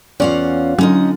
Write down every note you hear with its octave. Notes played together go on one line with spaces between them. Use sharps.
E2 C#4 F4 D5 F5 F#5
D3 F#3 C#4 D#4 F4 D#5